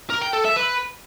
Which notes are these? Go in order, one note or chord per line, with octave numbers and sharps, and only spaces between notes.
A#4
G5
A4
E5
B4